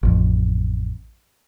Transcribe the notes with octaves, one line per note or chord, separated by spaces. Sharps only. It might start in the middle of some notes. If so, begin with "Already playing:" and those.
A1 F2